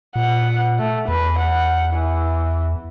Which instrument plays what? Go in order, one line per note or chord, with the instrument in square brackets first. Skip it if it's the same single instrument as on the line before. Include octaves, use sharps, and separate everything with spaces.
[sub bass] A#2 [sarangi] F#5
[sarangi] A3
[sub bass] E2 [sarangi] B4
[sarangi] F#5
E3